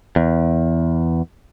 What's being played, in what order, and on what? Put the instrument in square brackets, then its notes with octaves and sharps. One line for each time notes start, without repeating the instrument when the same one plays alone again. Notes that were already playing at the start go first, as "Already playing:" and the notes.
[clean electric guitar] E2